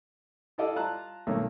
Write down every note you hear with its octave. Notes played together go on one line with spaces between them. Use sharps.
E4 G4 A4 D5 D#5 F5
F4 A5 A#5 F#6
B1 D#3 A3 A#3 C#5